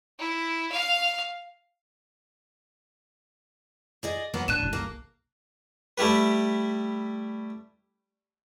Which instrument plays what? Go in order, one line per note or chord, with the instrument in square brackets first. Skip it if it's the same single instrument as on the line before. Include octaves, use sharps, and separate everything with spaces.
[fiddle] E4
F5
[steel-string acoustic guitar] G#4 D5 D#5
F#3 A#3 B3
[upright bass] A2 D3 [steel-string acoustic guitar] D4 [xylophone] F#6 D#7 E7
[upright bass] F#1 C2
[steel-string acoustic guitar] A#3
[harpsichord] G3 A3 E4 G4 B4